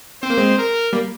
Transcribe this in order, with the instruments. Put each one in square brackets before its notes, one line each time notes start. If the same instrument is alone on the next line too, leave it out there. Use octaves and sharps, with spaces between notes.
[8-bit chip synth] C4 [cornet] C5
[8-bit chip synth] A#3
G#3 C4
[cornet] A#4
[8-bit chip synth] G3 A#3